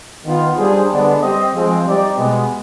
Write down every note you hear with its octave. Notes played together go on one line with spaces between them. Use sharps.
D#3 B3 F4
G3 D4 G#4 C5
D3 G#3 B3 D4
G3 C4 G4 C5 D#5
F3 G#3 C4
G3 C4 D#4 G4 D5
B2 G#3 B3